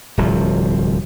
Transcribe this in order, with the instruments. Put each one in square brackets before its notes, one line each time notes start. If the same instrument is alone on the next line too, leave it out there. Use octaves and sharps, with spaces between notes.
[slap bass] D1 C2 F3